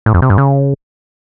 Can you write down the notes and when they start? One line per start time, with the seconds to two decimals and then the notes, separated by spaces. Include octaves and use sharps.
0.06 A2
0.14 F2
0.22 C3
0.30 G2
0.38 C#3